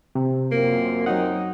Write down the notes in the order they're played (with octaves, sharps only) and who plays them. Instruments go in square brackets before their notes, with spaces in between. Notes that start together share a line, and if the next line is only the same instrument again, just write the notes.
[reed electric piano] C3
[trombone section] F#2 C4 F4 [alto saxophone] A#3
[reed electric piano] F#3 F#5 [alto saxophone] D#4